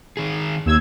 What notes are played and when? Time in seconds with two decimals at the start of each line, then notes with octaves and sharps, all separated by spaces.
0.17 D#3 G#4
0.65 D#2 E6 G#6